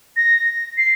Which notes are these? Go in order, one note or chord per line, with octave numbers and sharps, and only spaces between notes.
A#6
C7